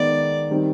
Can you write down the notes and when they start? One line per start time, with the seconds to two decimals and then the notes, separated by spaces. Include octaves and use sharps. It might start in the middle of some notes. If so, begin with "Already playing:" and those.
Already playing: D#3 G#3 B3 D#4 D5
0.51 D#3 G3 C4